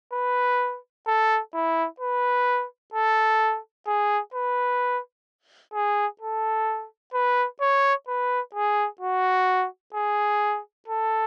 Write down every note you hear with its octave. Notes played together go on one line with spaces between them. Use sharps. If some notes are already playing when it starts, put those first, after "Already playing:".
B4
A4
E4
B4
A4
G#4
B4
G#4
A4
B4
C#5
B4
G#4
F#4
G#4
A4